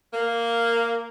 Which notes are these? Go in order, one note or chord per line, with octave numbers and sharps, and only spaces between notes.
A#3